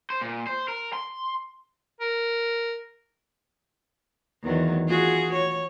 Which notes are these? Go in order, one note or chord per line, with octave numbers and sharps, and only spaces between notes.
C5
A#2
C5
A#4
C6
A#4
E2 D#3 F#3
F4 F#4 G#4
C#5